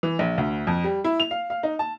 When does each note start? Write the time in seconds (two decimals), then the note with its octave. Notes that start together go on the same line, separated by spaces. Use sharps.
0.03 E3
0.19 A#1
0.38 D2
0.67 F2
0.84 G3
1.04 E4
1.20 F7
1.31 F5
1.50 F5
1.63 D#4
1.79 A5